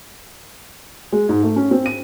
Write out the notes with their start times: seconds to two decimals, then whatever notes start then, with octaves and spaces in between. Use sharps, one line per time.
1.12 G#3
1.29 G#2
1.43 A3
1.56 C#4
1.71 C4
1.86 D#7